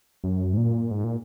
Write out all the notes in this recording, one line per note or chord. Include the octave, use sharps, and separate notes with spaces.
F#2
G#2
A#2
G#2
A#2